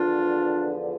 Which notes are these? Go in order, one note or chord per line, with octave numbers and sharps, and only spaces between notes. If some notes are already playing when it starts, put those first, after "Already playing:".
Already playing: E2 D3 F3 D4 F4